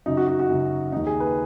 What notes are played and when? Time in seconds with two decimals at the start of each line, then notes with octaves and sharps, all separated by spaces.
0.06 F#2 C#3 D#4
0.17 F#4
0.28 F#4
0.39 F#4
0.49 F#2 C#3
0.92 D#2 D#3 D#4
1.07 G#4
1.20 B4